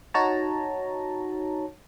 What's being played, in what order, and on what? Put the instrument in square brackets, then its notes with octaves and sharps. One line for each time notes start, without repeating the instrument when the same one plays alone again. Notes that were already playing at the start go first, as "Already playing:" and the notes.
[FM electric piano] D#4 F#4 C#5 A5 A#5